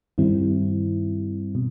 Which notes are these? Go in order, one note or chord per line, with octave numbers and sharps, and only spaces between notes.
G2 D#3 G3 C4 E4
B2